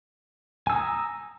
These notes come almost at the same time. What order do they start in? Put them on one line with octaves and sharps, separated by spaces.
G#5 E6 D#6 A#5